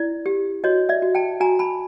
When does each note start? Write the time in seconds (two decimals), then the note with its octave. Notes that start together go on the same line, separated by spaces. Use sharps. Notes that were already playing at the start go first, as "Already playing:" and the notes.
Already playing: E4 D5
0.26 G4
0.64 F#4 C#5 D#5
0.89 D5 E5
1.02 F#4
1.15 G5 A5
1.40 F#4 G#5 A#5
1.59 A5 B5